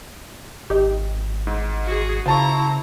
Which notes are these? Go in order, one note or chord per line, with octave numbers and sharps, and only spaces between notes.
G#1 D#4 G4
G#2
F#4 G#4
C#3 E4 F4 C5 A5 A#5 C#6